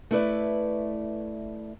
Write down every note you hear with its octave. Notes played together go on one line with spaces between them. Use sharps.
A3 E4 B4 D5